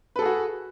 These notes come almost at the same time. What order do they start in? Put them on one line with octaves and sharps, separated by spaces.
B4 A4 G#4 F#4